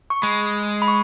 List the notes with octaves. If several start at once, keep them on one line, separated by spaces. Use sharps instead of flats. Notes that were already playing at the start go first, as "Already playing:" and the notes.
C#6
G#3 B5
B5
C#6